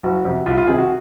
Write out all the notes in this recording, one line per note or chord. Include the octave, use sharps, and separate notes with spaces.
F#1 F#4
F2 C3
C2 F4
F4
C3 D#3 G#4
F#4